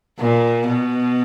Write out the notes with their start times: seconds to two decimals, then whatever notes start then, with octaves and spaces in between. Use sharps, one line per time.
0.19 A#2
0.67 B2